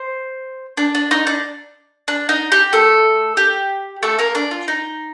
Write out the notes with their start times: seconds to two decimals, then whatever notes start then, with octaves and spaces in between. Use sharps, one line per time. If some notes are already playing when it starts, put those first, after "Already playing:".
Already playing: C5
0.77 D4
0.95 D4
1.11 D#4
1.27 D4
2.08 D4
2.29 D#4
2.52 G4
2.73 A3 A4
3.37 G4
4.03 A3 A4
4.19 A#3 A#4
4.35 D4 D5
4.51 F4
4.68 D#4